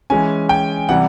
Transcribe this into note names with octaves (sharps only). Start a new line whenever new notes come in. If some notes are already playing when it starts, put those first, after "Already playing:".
E3 G#3 C#4 G#5
G5
C3 E3 G3 F#5